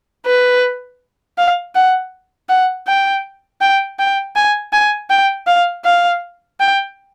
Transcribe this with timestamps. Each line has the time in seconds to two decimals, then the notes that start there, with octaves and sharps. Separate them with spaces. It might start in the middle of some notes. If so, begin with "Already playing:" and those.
0.26 B4
1.38 F5
1.75 F#5
2.49 F#5
2.87 G5
3.61 G5
3.99 G5
4.36 G#5
4.73 G#5
5.10 G5
5.47 F5
5.85 F5
6.59 G5